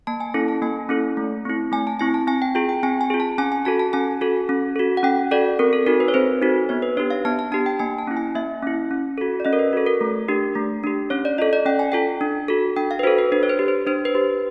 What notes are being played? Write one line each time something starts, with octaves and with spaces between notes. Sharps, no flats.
A#3 A5
G#5
C#4 E4 A4
A5
A#3 G#5
C#4 E4 A4
A3
C4 E4
A3 G#5
A5
C4 E4 G#5
A5
C4 G#5
G5
F4 G#4 G5
G5
C4 G#5
G#5
F4 G#4
A5
C#4 G#5
G#5
F#4 A4 A5
A5
C#4 G#5
F#4 A4
C#4
F#4 A4
F#5
C#4 G5
F#4 A4 D5
C4 A#4
A4
D#4 F#4 A4 A#4
B4
C#5
C4 C5
D#4 F#4 A4
B3 C#5
B4
D4 G4 C#5
F5
B3 A5
A5
D4 G4 A5
G5
A#3 G#5
A5
C#4 E4
G#5
A#3 E5
C#4 E4
C#4
F#4 A4
D5
C#4 D#5
A#4
B4
F#4 A4
A#4
A3
D4 G4
A3
D4 G4
C#4 C#5
D5
F4 A4 D#5
D5
C#4 G5
G#5
F4 A4 G5
D4
F#4 A4
D4 G5
F5
B4
F#4 A4 C5
B4
D4 B4
C#5
C5
G4
C5
D4 C5
B4
G4